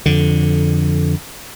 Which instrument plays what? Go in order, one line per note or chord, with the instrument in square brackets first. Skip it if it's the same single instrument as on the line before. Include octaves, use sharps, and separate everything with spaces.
[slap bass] F2 D3